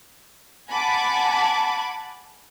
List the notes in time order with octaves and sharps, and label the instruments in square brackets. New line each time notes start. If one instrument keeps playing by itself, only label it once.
[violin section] F#5 G#5 A5 B5 D6